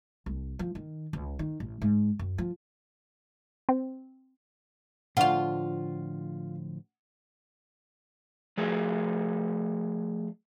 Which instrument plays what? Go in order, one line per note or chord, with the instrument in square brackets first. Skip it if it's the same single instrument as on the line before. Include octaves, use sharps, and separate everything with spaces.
[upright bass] C2
F3
D#3
C#2
D#3
A1
G#2
F#2
F3
[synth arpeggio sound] C4
[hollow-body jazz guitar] A2 D3 F3 [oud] F4 F5 [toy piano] F#5 C#6
[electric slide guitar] F3 A3 G#4